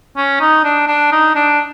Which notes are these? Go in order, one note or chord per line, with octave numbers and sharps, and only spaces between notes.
C#4
D#4
D4
D4
D#4
D4